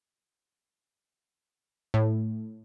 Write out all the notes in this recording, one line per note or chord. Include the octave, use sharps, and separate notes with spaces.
A2